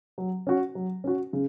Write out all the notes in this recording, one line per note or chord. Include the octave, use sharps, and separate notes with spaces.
F#3
C#4 F#4
F#3
C#4 F#4
C#3